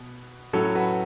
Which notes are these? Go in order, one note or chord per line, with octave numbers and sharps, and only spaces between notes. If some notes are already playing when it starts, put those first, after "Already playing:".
Already playing: B2 B3
A2 F#3 C#4 A4 C#5
F#4 B4